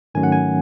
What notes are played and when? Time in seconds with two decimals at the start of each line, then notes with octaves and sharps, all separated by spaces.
0.14 G#2 D#3 F#3 A3 C#4 G#5
0.23 F#5
0.32 G#5